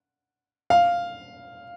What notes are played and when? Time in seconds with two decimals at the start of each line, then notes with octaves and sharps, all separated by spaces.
0.70 F5